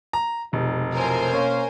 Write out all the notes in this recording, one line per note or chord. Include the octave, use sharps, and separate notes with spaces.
A#5
F1 B2 G3 G#3 D#4
A2 F3 F#3 A#4 C5 G#5
A#3 C#4